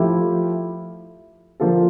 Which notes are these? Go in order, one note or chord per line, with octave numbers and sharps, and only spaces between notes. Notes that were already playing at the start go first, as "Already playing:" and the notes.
Already playing: F3 A3 E4 G4
D3 F3 A#3 F4 A4